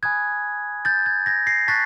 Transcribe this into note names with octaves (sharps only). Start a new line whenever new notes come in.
G#5 B5 D#6 F#6 G#6
G6 A6
G#6
G#6 A#6
A#6 C7
A5 C#6 F#6 A6 B6